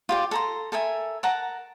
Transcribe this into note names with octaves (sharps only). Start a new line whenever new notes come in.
F4 G4 D5
A4 A#5 C6
A4 A#4 E5 G#5
A#4 F#5 A5 A#5